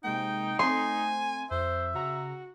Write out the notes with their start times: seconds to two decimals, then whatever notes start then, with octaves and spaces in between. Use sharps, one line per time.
0.04 C3 G#3 A#3 D#4 G5
0.59 A3 C4 G#5 C6
1.51 F2 C5 E5
1.94 C#3 F#4 A#5